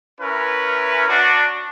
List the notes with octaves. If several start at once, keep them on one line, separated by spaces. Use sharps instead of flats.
C#4 E4 A#4 B4
D4 F#4